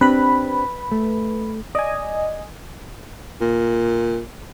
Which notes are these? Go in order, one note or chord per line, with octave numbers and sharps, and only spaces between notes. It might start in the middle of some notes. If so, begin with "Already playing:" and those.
C4 D4 G4 B4 B5
A3
D5 D#5 G#5
A#2